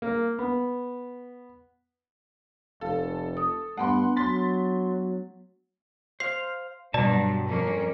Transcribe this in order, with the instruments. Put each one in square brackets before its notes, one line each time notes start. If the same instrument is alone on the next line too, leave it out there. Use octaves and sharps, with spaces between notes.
[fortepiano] A#3
B3
[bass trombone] F1 [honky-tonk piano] A4 [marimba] F5
[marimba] D#6
[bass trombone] G2 [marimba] A3 B3 D4 [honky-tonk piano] F#5 C6
[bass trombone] F#3 [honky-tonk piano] C6 A6 B6
[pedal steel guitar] C5 F5 [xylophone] C7
[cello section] G2 F#3 [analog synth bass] B2 [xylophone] D5 [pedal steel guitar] A5 A#5
[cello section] F2 A#3 C#4